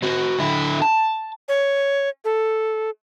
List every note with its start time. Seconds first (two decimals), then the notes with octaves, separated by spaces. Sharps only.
0.02 C4 F#4
0.39 D3 E4
0.82 A5
1.48 C#5
2.25 A4